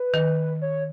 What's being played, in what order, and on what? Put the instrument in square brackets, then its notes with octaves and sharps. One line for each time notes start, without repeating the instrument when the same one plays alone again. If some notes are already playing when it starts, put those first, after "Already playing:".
Already playing: [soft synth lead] B4
[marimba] D#3
[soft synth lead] C#5